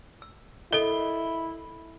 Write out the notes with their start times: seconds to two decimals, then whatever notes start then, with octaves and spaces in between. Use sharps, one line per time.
0.22 E6
0.73 E4 A4 A#4 D#5 G7